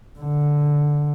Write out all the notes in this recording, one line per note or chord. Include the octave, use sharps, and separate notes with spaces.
D3